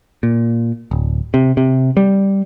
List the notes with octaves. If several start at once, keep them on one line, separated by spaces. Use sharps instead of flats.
A#2
D1
C3
C3
G3